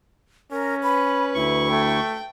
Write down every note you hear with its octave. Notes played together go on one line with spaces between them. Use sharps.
C#4 A#4
B4 B5
D2 E4 C#6
A3 G5